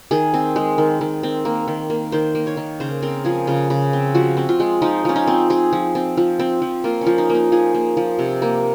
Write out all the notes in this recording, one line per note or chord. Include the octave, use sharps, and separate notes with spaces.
D#3 G#4
C4
G#3
D#3
D#3
C4
A#3
D#3
A#3
D#3 C5
A#3
C#5
D#3
C#3 C5
C4 A#4
F3 G#4
C#3 F4
C#3
C4
F3 F#4
C4
F4
G#3
F3 D#4
F3 C#4
D#4
C4
C4 G#4
F3
C4
F3
C4
F3
A#3 F4
C#4
F3
D#4
A#3 D#4
F3 G#4
A#3
F3
C3
A#3